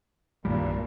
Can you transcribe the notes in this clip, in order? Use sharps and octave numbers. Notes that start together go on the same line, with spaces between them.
B1 G2 A#2 D#3 G3